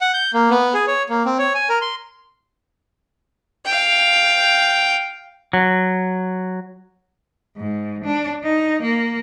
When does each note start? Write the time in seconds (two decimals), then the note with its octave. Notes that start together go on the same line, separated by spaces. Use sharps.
0.01 F#5
0.14 G6
0.34 A#3
0.50 B3
0.74 G#4
0.87 C#5
1.09 A#3
1.25 C4
1.38 C#5
1.54 G#5
1.69 A#4
1.81 C6
3.65 F5 G5
5.53 F#3
7.57 G#2
8.04 D4
8.44 D#4
8.82 A#3